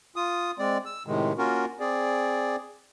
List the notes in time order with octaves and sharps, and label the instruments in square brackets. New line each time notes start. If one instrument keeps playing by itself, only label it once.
[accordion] F4 D#6
G#3 C4 D5
E6
A2 C3 D#3 G#3
A#3 C#4 F4 F#4 A#4
C4 G#4 D5